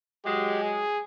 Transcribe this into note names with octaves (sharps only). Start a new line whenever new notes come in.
F#3 G#3 G4
G#4